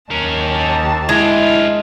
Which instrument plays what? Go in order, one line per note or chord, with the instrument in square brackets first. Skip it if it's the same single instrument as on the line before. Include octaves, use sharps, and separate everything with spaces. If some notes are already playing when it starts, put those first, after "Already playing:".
[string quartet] D#2 A5 [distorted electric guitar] C#4 A#4
[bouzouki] G#3 [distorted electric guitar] D4 F4 [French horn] E4